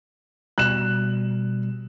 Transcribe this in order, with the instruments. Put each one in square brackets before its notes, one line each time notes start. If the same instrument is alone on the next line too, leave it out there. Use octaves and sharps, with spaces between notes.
[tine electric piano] B2 G3 [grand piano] F#6 E7